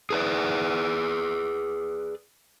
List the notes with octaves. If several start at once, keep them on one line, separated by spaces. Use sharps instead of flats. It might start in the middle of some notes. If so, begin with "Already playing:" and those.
G#4 B4 D5